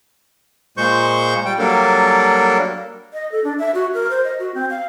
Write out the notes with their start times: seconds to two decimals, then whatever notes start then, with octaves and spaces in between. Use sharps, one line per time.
0.77 A#2 G#3 C5 C#6 G6
1.45 G3 G5
1.59 F#3 G3 A#3 D4 A4 A#4
3.13 D#5
3.32 A4
3.44 D4
3.59 E5
3.75 F#4
3.94 A#4
4.10 C5
4.25 D#5
4.39 F#4
4.55 C4
4.70 F5